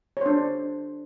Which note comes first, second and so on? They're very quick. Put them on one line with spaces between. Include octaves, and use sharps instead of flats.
C#5 C5 D4